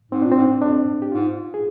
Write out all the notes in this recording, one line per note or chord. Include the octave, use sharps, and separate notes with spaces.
G#2 C4
A#2 D4
G#2 C4
F2 D4
G4
G#2 F4
G#4